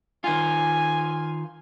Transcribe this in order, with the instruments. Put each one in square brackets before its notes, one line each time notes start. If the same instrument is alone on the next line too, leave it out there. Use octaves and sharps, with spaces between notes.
[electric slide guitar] D#3 F4 [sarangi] G#5